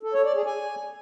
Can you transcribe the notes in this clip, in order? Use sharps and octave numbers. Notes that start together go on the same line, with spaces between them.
A4
C#5
D5
G#4
G#5